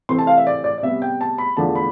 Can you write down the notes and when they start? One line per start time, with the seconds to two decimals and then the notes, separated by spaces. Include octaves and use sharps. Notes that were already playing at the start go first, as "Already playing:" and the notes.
0.09 C3 E3 A3 C4 C6
0.19 A5
0.27 F5
0.37 E5
0.47 D5
0.64 D5
0.78 D5
0.82 C3 G3 B3 E5
1.02 G5
1.21 A5
1.38 B5
1.57 E2 D3 F3 A3 A5
1.76 B5